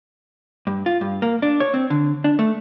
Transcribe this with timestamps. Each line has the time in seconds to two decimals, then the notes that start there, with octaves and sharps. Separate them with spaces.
0.67 G2
0.86 F4
1.01 G2
1.22 A#3
1.42 D4
1.60 C#5
1.74 C4
1.90 D3
2.24 D4
2.39 A3